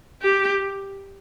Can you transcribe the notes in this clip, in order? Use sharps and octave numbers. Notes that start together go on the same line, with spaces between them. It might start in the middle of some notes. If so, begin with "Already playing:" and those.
G4